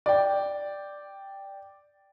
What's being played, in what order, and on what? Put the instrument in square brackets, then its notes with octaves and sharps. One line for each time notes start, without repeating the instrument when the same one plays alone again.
[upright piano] D5 G5